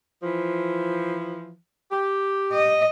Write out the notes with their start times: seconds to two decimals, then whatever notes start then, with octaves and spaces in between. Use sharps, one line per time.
0.22 E3 F3
1.90 G4
2.52 D#5